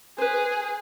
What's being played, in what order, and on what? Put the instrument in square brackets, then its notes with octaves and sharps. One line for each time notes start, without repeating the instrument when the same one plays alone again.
[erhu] G#4 [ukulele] B4 C5